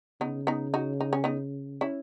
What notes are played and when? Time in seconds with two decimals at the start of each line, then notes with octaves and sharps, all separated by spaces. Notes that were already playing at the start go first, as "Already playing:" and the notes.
0.21 C#3 B3 D#4
0.47 B3 D#4
0.74 D#4 F#4
1.01 D#4
1.13 C#4
1.24 B3 D#4
1.81 C#4 E4